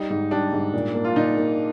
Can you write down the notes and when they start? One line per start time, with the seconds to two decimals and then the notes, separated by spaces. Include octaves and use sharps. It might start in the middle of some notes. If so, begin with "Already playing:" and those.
Already playing: G3 D#4
0.10 G#2
0.31 G3 D4
0.52 G#2
0.73 A#2
0.95 A#3
1.04 F4
1.16 A#2 D#4
1.37 A#3